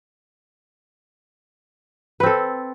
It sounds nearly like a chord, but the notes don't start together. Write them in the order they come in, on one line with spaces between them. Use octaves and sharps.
B4 C4 A4